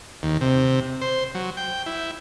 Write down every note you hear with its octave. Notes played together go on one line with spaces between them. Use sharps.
D#2
C3
C5
F#3
G5
E4